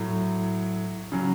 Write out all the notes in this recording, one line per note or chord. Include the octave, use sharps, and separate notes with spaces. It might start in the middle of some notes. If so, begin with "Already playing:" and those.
Already playing: A2 F#3
C#3 F#3